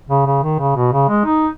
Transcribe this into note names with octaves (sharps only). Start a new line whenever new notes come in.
C#3
C#3
D#3
C#3
B2
C#3
G#3
D#4